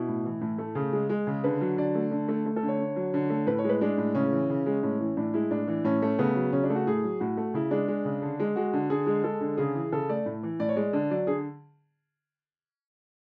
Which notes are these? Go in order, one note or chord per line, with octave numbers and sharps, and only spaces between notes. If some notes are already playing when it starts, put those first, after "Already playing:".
Already playing: B2 E4
A2
E3
A2
A3
C#3
G#3
G#3
C#3
D3 B4
F#3
D3 D5
A3
D3
A3
A3
A4
D3
C#5
D3
F#3
D3
A3
A2 B4
C#5
G#3
B4
G#3 D4
A2
C#3 C#4
E3
C#3
G#3
A2 C#4
E3
A2 D4
G#3 E4
A2 D4
E3
A2 C#4
A3
C#3 B3
F#3
C#3 C#4
D4
A3
F#4
A2 G#4
F#3
A2 F#4
A3
C#3 E4
G#3 D4
G#3
C#3
D3
G#3
G#3 F#4
D3
D3 G#4
G#3
G#3 A4
D3
C#3 G#4
E3
C#3 A4
A3 D5
A2
E3
A2 D5
C#5
G#3 D5
D3 D5
F#3 D5
D3 G#4